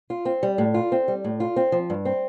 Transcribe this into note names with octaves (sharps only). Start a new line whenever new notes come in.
F4
C4
G3
A2
F4
C4
G3
A2
F4
C4
F3
G2
C4